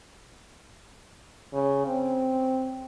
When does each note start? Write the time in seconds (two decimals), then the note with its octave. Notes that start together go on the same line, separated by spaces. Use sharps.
1.53 C#3
1.87 C4